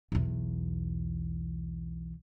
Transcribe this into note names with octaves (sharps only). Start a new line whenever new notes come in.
B1 E2